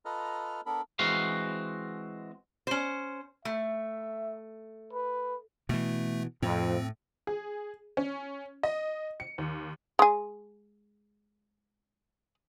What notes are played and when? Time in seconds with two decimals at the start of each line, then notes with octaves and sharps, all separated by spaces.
0.05 F4 A4 B4 D#5 A#5 F6
0.66 B3 D4 A4 A#4 B5
0.99 E3 G#3 C4 F#4 F5
2.67 C#4 C5
3.45 A3 E5
4.93 B4
5.69 B2 E3 A3
6.43 F2 A2 C4
7.27 G#4
7.97 C#4
8.63 D#5
9.20 C#7
9.38 D#2
9.99 G#3 G#4